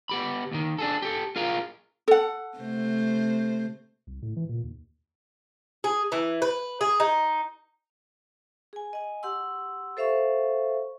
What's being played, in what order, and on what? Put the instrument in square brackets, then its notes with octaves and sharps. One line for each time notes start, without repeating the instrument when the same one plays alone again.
[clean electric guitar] B3 G4 B5
D#2 D#3
D4 G#4 A4
G4 A4
F4 G#4 A#4 F5
[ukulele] A4 F#5
[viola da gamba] C3 A3 C5
[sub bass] C2
A2
E3
A#2
D#2
[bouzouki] G#4
E3
B4
G#4
D#4
[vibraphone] G#4 G#5
D#5 G#5
G4 F#5 C6 E6
A4 C5 E5 F5 C#6